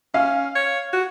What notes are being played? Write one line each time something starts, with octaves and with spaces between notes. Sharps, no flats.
C#4 F5
C#5
F#4